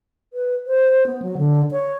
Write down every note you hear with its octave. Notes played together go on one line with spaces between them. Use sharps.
B4
C5
B3
F#3
D3
C#5